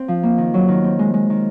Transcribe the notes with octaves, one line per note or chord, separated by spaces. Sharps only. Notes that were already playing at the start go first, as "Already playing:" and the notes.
Already playing: C4
F3
A#3
D#3
F#3
D#3
C4
G#3
G#3
D#3